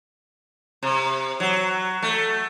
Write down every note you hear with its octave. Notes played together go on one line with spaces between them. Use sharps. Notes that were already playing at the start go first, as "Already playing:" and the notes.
C3
F#3
A3